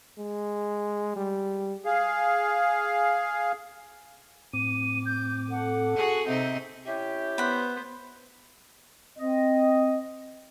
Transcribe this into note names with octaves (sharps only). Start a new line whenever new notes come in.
G#3
G3
G#4 F5
A2 C4 D6 D#7
G6
A4 F#5
F#4 G#4
C3 C4 D#4 E5
C#4 E4 G4 E5
B3 C5 F#5 B5
C4 D#5